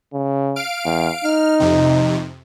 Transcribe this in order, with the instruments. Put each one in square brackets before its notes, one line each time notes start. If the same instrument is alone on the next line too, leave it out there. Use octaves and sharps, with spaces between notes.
[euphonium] C#3
[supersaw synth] F5 D7
[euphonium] E2
[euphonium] D#4 [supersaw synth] F6
[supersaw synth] F2 C3